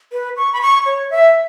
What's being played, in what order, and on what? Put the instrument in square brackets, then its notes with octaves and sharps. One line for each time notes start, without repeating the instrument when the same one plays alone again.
[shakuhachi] B4
C#6
B5
C#6
C#5
E5